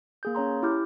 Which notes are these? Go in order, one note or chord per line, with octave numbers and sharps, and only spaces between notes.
A#3 G#4 G6
C#4 C#5 A#5 C6
E4 G4 D6 F6 G6